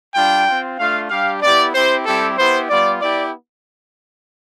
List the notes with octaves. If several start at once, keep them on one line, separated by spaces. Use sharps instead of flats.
G3 D4 F4 G5
C4 F4
A3 D4 F4 F5
G3 D4 G4 F5
B3 E4 G4 D5
C4 E4 G4 C5
G3 C4 E4 G4 A4
B3 E4 G4 C5
G3 B3 F4 D5
B3 E4 G4 D5